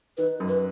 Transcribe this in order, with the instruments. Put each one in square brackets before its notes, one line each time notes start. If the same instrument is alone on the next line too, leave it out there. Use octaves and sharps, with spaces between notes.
[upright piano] D#3 [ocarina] B4
[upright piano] F#2
[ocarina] B4